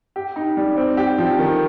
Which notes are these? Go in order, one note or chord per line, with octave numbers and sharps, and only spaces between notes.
G4
D#4
G3
C4
G4
F3
D#3